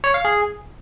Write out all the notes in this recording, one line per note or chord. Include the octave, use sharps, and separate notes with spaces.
C#5
F5
G#4